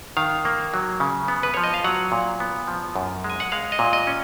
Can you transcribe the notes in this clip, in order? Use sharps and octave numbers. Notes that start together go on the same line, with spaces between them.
D#3 F5
A#3
F#3
C#3
B3
B4
F3 C#5
D#5
F5
F#3 F#5
A#2
B3
F3
F#2
G#3
G#5
F#5
G#3 F5
D#5
A#2
D#5
C#4